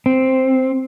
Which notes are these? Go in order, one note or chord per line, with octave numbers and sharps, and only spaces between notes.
C4